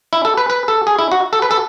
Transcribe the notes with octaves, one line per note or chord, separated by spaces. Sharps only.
E4
A4
B4
B4
A4
G#4
E4
F#4
A4
B4
A4